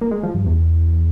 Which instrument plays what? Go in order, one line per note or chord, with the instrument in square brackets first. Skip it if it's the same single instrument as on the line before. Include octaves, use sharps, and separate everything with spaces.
[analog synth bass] A#3
G#3
F3
G2
E2